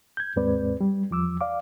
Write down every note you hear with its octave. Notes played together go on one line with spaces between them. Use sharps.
G6 G#6
D#2 G#2 G#3 C4 B4 D5
G3
E2 F3 D6 E6
D5 F5 D6